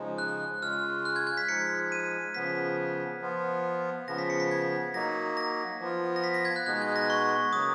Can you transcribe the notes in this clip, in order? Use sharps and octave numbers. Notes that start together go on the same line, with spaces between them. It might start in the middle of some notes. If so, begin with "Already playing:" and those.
Already playing: C#3 F3 G#3 D#4
F#6
C#3 G#3 C#4 F4 F6
F#6
G#6
G#6
B6
F3 G#3 D#4 C#7
D#7
C#3 F3 B3 B6
F3 B3 F4
C#3 F3 B3 A#6
B6
C#7
B6
G#6
F#3 A#3 D#4 A#6
A#6
F3 B3 F4
A#6
B6
A#6
G#6
F#6
B2 G#3 B3 D#4 F#6
G#6
A#6
C#6
C#3 F#3 A#3 D#6